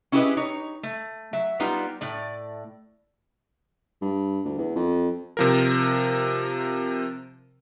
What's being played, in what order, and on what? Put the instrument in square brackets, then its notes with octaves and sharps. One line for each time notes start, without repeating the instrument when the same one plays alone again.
[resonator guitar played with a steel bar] C#4 E4 G4 G#4 B4 D#5
D#4 C#5
A3
F#3 E5
G3 B3 D#4 F4
A2 A3 D5
[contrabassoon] G2
D2
E2
F2
[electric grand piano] C3 F3 A#4